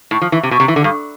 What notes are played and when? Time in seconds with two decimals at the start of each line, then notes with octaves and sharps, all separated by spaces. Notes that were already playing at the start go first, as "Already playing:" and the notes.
0.11 A2
0.21 F3
0.32 E3
0.43 C3
0.51 B2
0.60 C3
0.68 E3
0.76 D3
0.84 G2